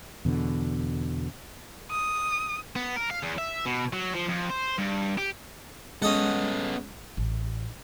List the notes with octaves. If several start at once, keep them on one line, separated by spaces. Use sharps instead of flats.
E2 B2 D3
D#6
B3
A#4
F5
E2
E5
B2
F#3
F3
F2
C5
G2
G4
G#3 B3 C#4 A4 D#5 F#5
A1